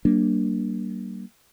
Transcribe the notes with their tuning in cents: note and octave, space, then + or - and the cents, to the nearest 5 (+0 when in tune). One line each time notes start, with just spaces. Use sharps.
G3 -40 A#3 +0 D4 +0